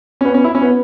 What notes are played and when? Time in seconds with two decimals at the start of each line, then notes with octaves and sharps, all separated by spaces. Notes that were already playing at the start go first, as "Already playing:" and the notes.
0.21 C#4
0.25 B3
0.34 C#4
0.44 E4
0.55 C#4
0.62 B3